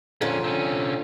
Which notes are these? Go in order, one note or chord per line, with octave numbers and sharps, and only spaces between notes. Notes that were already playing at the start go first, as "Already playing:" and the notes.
F2 A#2 D3 F3 C#4
C3 C#4